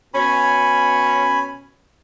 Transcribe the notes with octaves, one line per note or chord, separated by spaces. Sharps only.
B2 C#4 G#5 B5